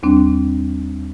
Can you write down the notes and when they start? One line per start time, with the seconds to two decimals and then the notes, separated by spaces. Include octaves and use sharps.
0.03 D#2 G3 C4 D4